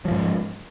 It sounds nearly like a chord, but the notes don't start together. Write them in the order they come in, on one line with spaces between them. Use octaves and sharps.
F#3 F3 G#2